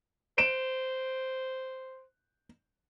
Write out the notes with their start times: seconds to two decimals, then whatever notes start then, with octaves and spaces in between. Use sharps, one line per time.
0.38 C5 D7 E7